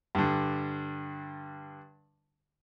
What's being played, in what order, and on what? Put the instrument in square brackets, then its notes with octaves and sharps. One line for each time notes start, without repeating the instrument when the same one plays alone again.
[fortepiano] G2 D3